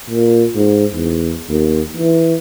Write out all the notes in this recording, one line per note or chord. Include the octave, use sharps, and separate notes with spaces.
A#2
G#2
E2
D#2
E3